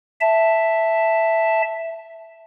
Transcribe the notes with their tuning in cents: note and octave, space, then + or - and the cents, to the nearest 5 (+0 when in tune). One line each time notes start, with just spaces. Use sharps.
E5 +0 A5 +0